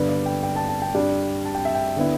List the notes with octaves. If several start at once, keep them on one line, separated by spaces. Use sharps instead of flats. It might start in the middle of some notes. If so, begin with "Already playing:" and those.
Already playing: G2 D3 B3 B4
D5
G5
G5
A5
A5
G5
G2 G3 D4 D5
A5
G5
E5
G5
D3 B3 E4